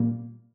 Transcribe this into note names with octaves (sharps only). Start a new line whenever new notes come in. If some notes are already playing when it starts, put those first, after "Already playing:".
Already playing: A#2 G3 A#3